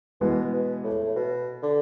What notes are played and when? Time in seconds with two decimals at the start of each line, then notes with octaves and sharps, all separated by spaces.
0.21 B2 E3 G#3 B3
0.53 B2
0.84 A2
1.04 A2
1.16 B2
1.63 D3